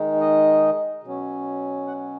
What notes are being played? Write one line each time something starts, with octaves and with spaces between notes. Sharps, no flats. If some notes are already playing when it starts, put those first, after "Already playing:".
Already playing: D#3 G#3 D#4
D#5
B2 F#3 C#4
F#5